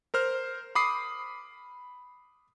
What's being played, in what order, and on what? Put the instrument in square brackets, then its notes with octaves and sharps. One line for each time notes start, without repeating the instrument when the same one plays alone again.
[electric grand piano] A#4 C5 F6
B5 D6 D#6 C7